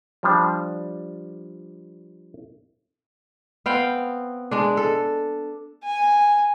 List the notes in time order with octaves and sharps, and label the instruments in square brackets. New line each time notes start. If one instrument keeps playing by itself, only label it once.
[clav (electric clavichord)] F3 G3 D4
[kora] B3 C4 F5 G5
G#3 D4
A4
[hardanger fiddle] G#5